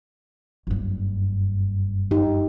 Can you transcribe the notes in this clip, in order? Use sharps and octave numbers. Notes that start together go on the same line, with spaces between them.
F#1 G2
D#4 G4